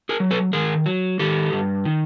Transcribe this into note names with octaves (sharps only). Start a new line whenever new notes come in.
G#4 A#4
F#3
A4 B4
D#3 G#4 A#4
F#3
D#3 G4 A4
G2
D#3